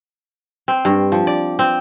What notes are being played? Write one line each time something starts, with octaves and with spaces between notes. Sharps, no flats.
C4
G2
F3
D5
C4